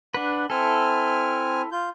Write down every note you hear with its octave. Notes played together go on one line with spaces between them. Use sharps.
D4 B4 F#5
C4 E4 A4 G#5 F6
F4 G6